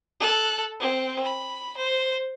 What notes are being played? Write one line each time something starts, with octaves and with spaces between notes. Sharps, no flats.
A4 F#6
C4
B5
C5